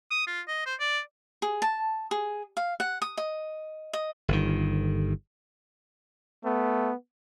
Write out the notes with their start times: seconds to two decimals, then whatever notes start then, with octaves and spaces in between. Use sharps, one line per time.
0.11 D#6
0.27 F4
0.48 D#5
0.66 C5
0.80 D5
1.42 G#4
1.62 A5
2.11 G#4
2.57 F5
2.80 F#5
3.02 D#6
3.17 D#5
3.93 D#5
4.28 G1 D#3
6.45 A3 B3